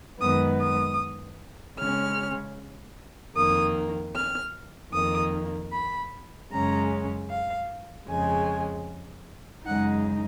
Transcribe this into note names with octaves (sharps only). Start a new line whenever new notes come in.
F#2 D#3 G#3 B3 D#6
D#6
C#3 G#3 C#4 F6
F2 D#3 A#3 D#6
F6
F2 D#3 A#3 D#6
B5
F#2 C#3 G#3 C#4 A#5
F5
F2 C#3 G#3 G#5
F#2 C#3 G#3 D#4 F#5